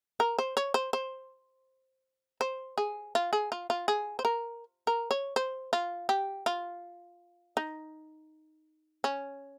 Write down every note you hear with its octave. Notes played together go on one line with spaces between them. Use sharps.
A#4
C5
C#5
C5
C5
C5
G#4
F4
G#4
F4
F4
G#4
C5
A#4
A#4
C#5
C5
F4
G4
F4
D#4
C#4